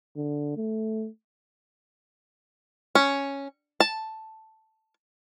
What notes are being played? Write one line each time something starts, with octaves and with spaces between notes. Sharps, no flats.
D3
A3
C#4
A5